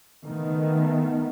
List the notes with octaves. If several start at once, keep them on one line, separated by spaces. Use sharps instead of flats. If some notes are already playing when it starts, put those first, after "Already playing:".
D#3 A3 B3